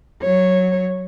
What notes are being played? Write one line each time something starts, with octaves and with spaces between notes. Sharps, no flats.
F#3 C#5